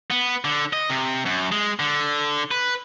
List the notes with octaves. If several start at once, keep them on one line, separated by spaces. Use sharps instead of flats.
B3
D3
D#5
C3
F#2
G#3
D3
B4